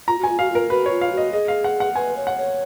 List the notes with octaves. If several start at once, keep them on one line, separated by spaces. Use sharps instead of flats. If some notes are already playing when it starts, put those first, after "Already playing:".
F4 A#5
F#4 G#5
F4
F#4 F5
F4 A#4
F#4 B4
C#5
F4
F5
F#4
D#5
G#4 D#5
F5
F#5
F#5
B4 G#5
C#5
F#5
C#5